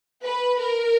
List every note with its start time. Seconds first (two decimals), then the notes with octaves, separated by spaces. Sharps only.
0.23 B4
0.59 A#4